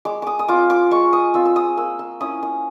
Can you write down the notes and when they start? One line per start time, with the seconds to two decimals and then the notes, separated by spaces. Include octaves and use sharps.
0.05 G#3 D6
0.22 D6 D#6
0.39 D#6
0.48 C4 F4 D6
0.70 D6
0.91 G#3 C#6
1.13 D#6
1.34 C4 F4 E6
1.45 E6
1.56 D#6
1.77 A#3 E6
1.99 E6
2.20 C#4 E4 D#6
2.43 D#6